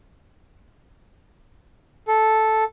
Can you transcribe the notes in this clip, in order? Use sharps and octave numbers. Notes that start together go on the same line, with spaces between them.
A4